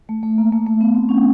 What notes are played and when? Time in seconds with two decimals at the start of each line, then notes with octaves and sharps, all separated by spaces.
0.09 A3
0.23 A3
0.38 A#3
0.53 A3
0.67 A3
0.81 B3
0.95 C4
1.09 C#4